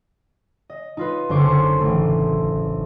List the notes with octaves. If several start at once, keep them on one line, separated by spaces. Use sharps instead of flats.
D#5
D#4 F4 B4
F#1 D3 C5 C#6 D6
A1 A3